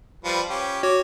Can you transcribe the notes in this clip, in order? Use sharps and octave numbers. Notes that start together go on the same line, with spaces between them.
F3 G3 B4
C#4 G4
F#4 C#5 D6